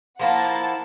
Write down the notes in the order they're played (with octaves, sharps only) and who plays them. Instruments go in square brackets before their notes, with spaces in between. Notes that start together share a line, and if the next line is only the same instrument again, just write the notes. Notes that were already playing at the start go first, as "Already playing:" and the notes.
[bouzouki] F3 A#3 E4 [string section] F#5 A5